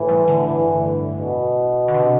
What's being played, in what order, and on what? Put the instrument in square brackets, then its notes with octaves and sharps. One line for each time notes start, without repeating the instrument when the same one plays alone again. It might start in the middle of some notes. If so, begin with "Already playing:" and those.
Already playing: [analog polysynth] A2 [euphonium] E3
[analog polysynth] G2
D3
[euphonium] E3
B2
[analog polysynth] D3
C3